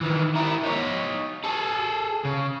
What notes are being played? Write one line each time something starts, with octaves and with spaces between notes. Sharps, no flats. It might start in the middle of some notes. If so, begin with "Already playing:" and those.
D#3 E3
E4 A#4
D#4 C#5
G#4 A4
C#3